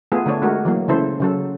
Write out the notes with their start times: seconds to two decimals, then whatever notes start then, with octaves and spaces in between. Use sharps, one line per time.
0.12 A3 B3 F4 G#4
0.26 D3 A3 D4 C#5
0.42 G#3 A3 F#4 A#4
0.65 E3 F#3 A#3
0.88 C#3 E3 E4 A4 C5
1.20 C#3 F#3 A4